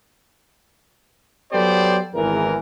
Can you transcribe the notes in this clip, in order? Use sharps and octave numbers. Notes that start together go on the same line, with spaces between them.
F#3 B3 G4 A4 C5 D5
G#1 E2 E3 A#4